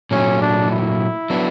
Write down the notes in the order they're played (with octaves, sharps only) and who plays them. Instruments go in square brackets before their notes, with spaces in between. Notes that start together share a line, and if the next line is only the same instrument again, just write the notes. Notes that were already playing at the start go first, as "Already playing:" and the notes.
[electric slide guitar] A#2 F#3 A3 [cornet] C#4
[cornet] D4
E4
[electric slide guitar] F#3 B3 D4